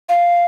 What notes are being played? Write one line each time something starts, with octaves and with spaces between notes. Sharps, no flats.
F5